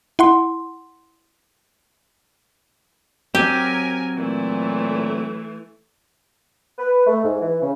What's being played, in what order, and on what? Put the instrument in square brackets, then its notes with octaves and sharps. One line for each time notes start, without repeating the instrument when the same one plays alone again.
[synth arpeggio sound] E4 F#5 C6
[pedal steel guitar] F#3 C4 [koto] G4 [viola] A#4 G#5
[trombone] A#2 [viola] E3 A3
[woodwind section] B4
A3
G#2
E3
C#3